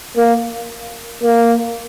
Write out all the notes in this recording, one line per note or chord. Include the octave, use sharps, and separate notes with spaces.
A#3
A#3